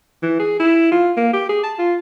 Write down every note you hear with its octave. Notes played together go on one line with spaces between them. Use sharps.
E3
G#4
E4
F4
A#3
G4
G#4
A5
F4